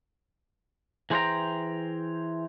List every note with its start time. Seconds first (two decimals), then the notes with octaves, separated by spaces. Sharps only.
1.10 E3 G#4 C5 F5 G5 A#5